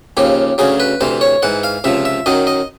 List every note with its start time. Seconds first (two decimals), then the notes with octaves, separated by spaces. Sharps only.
0.17 D#2 C#3 F3 G4
0.58 D2 C#3 F#3 G#4
0.80 B4
1.01 D2 C3 E3 C5
1.21 C#5
1.42 G#2 E3 F#5
1.63 F5
1.84 C#2 C3 F3 E5
2.05 E5
2.26 F#2 D#3 F#3 D#5
2.47 D#5